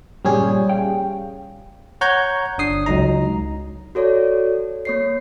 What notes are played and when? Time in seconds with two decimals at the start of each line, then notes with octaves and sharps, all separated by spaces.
0.25 G2 A#2 F3 G3 C#4 G#4
0.69 F5 G5
2.01 C#5 F#5 A#5 G6 G#6
2.58 G1 D4 D#6 C7
2.86 C#2 F#3 D#4 A#5
3.95 F#4 A4 C#5 D5
4.85 A#3 C#5 C7